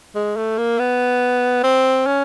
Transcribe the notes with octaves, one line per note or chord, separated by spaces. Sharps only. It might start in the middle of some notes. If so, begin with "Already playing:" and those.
G#3
A3
A#3
B3
C4
C#4